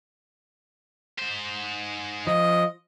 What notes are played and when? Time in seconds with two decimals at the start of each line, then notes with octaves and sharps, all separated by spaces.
1.19 G#2 C5
2.27 F3 D#5